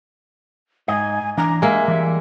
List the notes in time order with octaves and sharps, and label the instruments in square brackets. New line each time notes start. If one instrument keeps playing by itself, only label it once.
[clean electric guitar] G#2 D#5 [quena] G#5
[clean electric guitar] E3 D4 [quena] A#5
[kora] G#3 A#3 [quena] E5 [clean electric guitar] G#5
[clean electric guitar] E3 G3